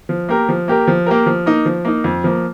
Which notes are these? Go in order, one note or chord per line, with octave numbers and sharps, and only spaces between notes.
F3
A#3 G4 A#4
F3
A#3 G4 A#4
F3
A#3 G4 A#4
F3
A#3 D#4
F3
A#3 D#4
F2
F3 A#3